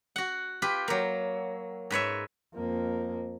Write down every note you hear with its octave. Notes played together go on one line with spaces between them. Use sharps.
F#4 F#5
F4 G4 B4
F#3 A#3
G#2 B4 C#5 E5
F2 A#3